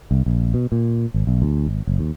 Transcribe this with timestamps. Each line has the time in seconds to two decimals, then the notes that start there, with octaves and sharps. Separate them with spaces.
0.11 C2
0.26 A#1
0.54 B2
0.72 A#2
1.14 G#1
1.27 B1
1.42 D2
1.67 G#1
1.87 F#1
1.99 D#2